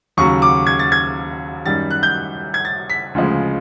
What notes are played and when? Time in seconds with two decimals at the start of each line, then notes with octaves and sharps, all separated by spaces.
0.17 D#2 C#3 F#3 C#6
0.42 D6
0.67 G#6
0.79 A6
0.92 G#6
1.66 F#2 D#3 G3 A6
1.91 F#6
2.03 G6
2.54 G#6
2.65 A6
2.90 B6
3.14 D2 C#3 F3 G#3